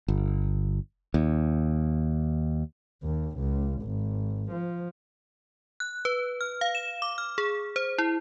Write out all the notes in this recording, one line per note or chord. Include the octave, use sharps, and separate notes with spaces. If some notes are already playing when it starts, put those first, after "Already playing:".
G1
D#2
D#2
C#2
G#1
F3
F#6
B4
F6
F5
E7
D6
F6
G#4
C5
E4